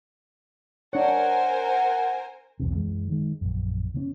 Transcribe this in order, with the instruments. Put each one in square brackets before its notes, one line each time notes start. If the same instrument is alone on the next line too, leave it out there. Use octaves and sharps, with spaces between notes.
[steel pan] D4 C#5 [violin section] A#4 C5 G#5 [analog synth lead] F#5
[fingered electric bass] B1 E2 G2 C3
F#2 E3 G#3
D#3 G#3
A#1 F#2
C#3 A#3 C4 C#4